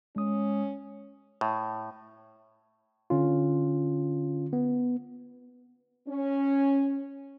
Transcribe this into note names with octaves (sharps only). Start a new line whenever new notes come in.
G#3 C#4 D#6
A2
D3 C#4 F4
B3
C#4